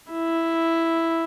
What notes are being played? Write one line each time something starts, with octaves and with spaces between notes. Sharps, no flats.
E4